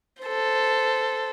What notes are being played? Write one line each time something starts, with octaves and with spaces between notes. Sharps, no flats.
A4 C5